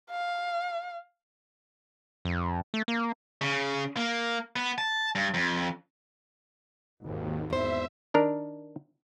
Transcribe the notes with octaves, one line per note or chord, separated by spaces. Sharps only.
F5
F2
A3
A#3
C#3
A#3
B3
A5
G2
F2
G#1 D#2
E2 C5 E5
D#3 D4 A#4